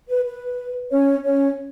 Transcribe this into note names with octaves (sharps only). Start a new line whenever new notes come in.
B4
B4
C#4 C#5
C#4 C#5